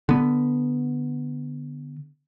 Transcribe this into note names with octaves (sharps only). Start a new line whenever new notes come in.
D3 B3